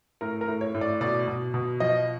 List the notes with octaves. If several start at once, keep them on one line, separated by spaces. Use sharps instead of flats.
A2 A#4
A#4
A2
C#5
A2
D5
B2 D5
B2
B2
F3 D#5